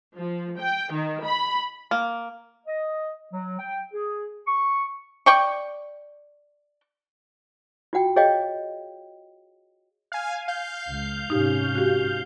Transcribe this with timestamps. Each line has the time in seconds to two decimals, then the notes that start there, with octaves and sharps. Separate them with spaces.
0.17 F3
0.57 G5
0.91 D#3
1.23 B5
1.91 A#3
2.67 D#5
3.33 F#3
3.59 G5
3.93 G#4
4.47 C#6
5.26 D5 G5 C#6
7.93 F4 F#4 F#5 G5
8.16 G#4 C#5 D#5 F5 G5
10.12 F5 G#5
10.48 F5 G6
10.89 C#2
11.30 G#2 C3 C#4 D#4 G4
11.75 F#4 G4